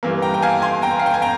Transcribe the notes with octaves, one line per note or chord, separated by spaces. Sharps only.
G2 E3 A#3
G5 A#5
G5
F5 G#5
G#5 C6
G5 A#5
F5
G5
G#5
G5 A#5